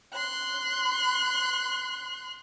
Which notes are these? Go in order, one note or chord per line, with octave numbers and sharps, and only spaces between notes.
C6 F#6